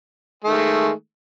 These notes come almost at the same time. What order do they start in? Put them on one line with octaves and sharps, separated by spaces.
A3 D#3 G#3